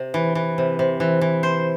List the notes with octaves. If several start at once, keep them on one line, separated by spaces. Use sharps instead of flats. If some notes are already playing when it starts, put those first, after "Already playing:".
Already playing: C3
E3
E3
C3
C3
E3
E3
C5